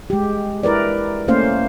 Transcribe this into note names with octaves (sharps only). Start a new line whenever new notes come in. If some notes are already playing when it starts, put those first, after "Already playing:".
G#3 G4
E4 A#4 B4 D5
A3 A#3 C#4 C5 F5